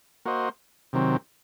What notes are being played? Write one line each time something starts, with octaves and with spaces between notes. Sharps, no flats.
A#3 F#4 C5 D#5
C3 D#3 F#3 C4